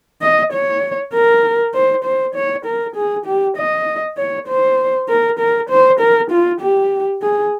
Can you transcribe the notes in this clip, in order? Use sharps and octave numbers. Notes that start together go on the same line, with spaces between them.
D#5
C#5
A#4
C5
C5
C#5
A#4
G#4
G4
D#5
C#5
C5
A#4
A#4
C5
A#4
F4
G4
G#4